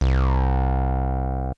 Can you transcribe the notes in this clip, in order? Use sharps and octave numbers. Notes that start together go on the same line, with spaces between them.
C2